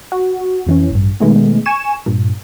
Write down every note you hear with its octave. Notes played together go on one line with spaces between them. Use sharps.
F#4
F2 E3 C#4
A1 G2
B2 D#3 G#3 A3 B3
G#5 C#6 E7
G2 A#2